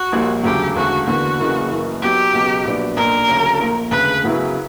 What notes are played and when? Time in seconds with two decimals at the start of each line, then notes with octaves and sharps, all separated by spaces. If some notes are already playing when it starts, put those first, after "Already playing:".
Already playing: F#4
0.12 A#1 A#2 G3
0.43 E1 D2 C#3 F#3 G4
0.75 E1 D2 C#3 F#4
1.07 E2 D3 A#3 F#4
1.39 F#1 F#2 C#3 E3 A#3
1.71 F#1 F#2 E3 A#3
2.02 B1 B2 F#3 G4
2.33 C#2 B2 F#3
2.64 A#1 A#2 F#3 B3 D4
2.96 B1 A#2 A#3 D4 A#4
3.28 D2 C#3 F#3 C#4
3.60 A#1 A#2 A#3
3.91 E1 D2 C#3 B4
4.23 F#2 C#3 F#3 B3 E4